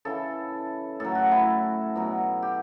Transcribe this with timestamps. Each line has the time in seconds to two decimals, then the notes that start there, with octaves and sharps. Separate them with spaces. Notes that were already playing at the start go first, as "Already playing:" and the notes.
0.05 C#3 E3 A4
1.00 A2 F#3 A4
1.15 F#4
1.32 E4
1.95 B2 F#3
2.42 G4